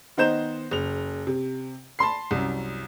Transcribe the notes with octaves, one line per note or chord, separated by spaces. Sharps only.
D#3 B3 D#4 C5 G6 E7
F#1 F7
C3
A5 B5 C6 C7
C2 F#2